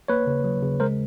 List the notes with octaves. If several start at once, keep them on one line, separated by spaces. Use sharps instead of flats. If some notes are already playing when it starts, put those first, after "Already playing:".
A#3 B4 C#5
C#3
F#3
C#3
G#3 A#4 C5